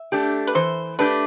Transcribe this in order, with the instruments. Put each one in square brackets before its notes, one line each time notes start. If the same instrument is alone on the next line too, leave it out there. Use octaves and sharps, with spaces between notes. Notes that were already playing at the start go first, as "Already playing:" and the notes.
Already playing: [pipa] E5
[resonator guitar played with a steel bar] A3 D4 G4
[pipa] B4
[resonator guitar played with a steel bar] E3 [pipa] C5
[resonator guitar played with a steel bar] A3 D4 G4 [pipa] B4